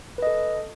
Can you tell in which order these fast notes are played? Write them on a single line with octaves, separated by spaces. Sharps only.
B4 D#5 A4